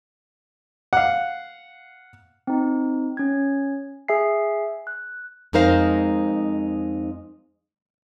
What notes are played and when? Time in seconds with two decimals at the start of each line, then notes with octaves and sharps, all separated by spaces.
0.93 F5 F#5
2.47 C4 D#4
3.17 C#4 G#6
4.08 G#4 E5 G#5 C7
4.87 F#6
5.53 F2 G#3 D#4 A#4 C5 F5